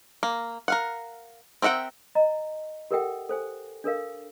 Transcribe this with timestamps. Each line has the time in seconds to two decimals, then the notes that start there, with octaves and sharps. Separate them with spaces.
0.23 A#3
0.68 A#4 F5 F#5
1.62 C4 A#4 E5 F#5 G5
2.15 D#5 A#5
2.91 G4 A4 A#4 E5 F#5 G5
3.29 A4 C5 G#5
3.84 D4 A4 A#4 F5